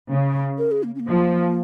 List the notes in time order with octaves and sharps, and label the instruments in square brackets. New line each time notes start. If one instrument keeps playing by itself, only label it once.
[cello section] C#3
[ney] A#4
G#4
A#3
C#4
A#3
[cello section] F3